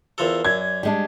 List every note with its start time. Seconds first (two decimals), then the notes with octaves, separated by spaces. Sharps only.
0.18 E2 F3 A4 A#4 E6
0.45 F#2 D5 G#6
0.83 G3 G#3 D4